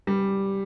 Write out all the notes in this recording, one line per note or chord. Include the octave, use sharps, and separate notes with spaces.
G3